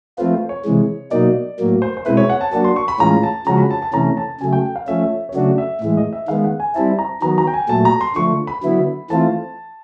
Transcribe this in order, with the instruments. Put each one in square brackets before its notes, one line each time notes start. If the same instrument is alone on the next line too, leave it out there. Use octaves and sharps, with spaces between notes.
[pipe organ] F3 A3 C4 F4 [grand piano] B4
[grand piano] C5
C#5
[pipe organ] C3 E3 G#3
[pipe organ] B2 F#3 A#3 D#4 [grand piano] D5
[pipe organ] A2 F#3 A#3
[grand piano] C5
C5
[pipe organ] B2 G#3 C4 E4 [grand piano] B4
[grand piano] C#5
F#5
A5
[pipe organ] F#3 A#3 D4 F#4 [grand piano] A5
[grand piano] C6
C#6
B5
[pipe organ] A2 E3 G#3 C#4 F4 [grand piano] A#5
[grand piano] A5
[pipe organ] C#3 F3 G#3 C#4 F#4 [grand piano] A#5
[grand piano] B5
A5
A5
[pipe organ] C3 E3 A3 C#4 [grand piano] A#5
[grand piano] A5
[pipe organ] C#3 F#3 A3 [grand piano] G#5
[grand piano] G5
F5
[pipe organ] F3 A3 C#4 [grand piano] E5
[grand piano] E5
C#5
[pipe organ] C#3 F#3 A3 D4 F#4 [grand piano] D5
[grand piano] E5
[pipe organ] A2 E3 G#3 [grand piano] E5
[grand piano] D#5
E5
[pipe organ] D#3 G#3 B3 [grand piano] F5
[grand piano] F#5
G#5
[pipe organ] G3 C4 E4 [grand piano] A5
[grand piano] A#5
[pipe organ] D#3 F#3 B3 [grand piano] A#5
[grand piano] A#5
G5
G#5
[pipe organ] A#2 F#3 A3 [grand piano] A5
[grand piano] A#5
C6
[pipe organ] D3 F3 A3 [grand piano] C#6
[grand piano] B5
[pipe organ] D3 F#3 B3 E4
[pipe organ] E3 A3 C4 F4 [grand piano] A5